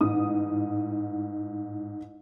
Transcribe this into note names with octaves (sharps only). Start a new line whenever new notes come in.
A1 G#2 D#6